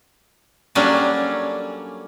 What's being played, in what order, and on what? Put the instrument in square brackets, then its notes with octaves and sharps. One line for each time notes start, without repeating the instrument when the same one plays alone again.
[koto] F#3 G3 A#3 C#4 D4 A4